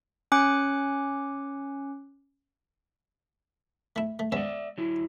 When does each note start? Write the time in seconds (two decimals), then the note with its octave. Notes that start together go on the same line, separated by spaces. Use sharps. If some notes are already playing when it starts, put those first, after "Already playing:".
0.32 C#4 G#5 D6 F#6 C#7
3.96 A3 E4
4.19 A3
4.32 G#3 B3 C#4 D5 E5
4.78 F#3 E4